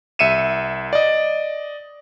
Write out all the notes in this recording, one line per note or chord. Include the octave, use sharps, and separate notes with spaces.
C2 E5 C#7 D#7 E7
D5 D#5